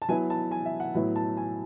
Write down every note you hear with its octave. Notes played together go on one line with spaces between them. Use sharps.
A5
F#3 B3 E4 G#5
A5
G#5
E5
F#5
A2 F#3 B3 E4
A5
G#5